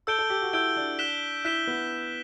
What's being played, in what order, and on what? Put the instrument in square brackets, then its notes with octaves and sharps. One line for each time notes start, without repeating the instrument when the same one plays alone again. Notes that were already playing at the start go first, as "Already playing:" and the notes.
[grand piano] A4 [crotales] E6 G6 D7 G7
[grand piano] A4
G4
F#4
[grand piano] E4 [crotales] E6 G6 D7 G7
[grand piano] D4
[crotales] F#6 B6 E7 G7
[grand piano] E4 [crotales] F#6 B6 E7 G7
[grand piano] B3